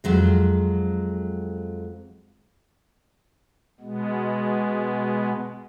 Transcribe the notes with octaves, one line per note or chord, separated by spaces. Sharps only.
F2 F#3 G#3
B2 G#3 B3